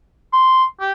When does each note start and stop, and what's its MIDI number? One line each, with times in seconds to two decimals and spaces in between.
0.33 0.64 84
0.80 0.92 67